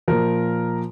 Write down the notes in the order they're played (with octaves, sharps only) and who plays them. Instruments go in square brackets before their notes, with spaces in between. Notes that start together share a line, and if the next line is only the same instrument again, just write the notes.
[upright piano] A#2 F3 A#4